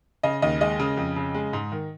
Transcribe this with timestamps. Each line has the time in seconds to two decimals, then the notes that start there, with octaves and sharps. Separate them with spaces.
0.23 C#3 D#5
0.42 D#2 D#5
0.61 G#3 D#5
0.79 C#3
0.97 F2
1.16 C#3
1.34 G#3
1.53 G#2
1.72 D#3